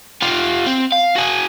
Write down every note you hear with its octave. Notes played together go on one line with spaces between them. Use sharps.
F4 G4
C4
F5
F#4 G#4